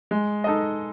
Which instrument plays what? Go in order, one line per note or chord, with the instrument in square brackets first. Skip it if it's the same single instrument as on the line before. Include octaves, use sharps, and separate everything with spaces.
[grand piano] G#3
D#4 A4 D#5